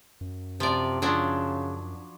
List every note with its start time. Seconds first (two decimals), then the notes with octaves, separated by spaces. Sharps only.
0.21 F#2
0.60 C3 F3 D5
1.02 C#3 F3 F#3 D4